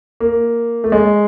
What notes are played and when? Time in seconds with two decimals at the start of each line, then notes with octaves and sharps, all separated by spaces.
0.20 A#3
0.84 A3
0.92 G#3